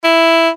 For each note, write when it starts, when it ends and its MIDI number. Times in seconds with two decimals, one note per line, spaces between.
0.04 0.49 64